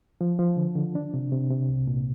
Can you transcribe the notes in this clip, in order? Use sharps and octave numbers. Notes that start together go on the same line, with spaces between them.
F3
F3
D3
D3
D4
C3
C3
C3
C2
A#2